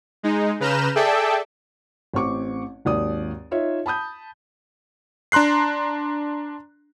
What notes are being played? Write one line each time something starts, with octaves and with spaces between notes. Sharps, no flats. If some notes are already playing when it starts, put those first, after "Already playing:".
G#3 D#4
C#3 B4 A#5 F6 G6 E7
G#4 A4 D5 E5 G5 A5
A1 C4 C#6 D6
G#1 D#2 D5 D#6
D#4 F4 C#5 E5
A5 B5 D#6 G6
D4 A#5 C6 F#6 C7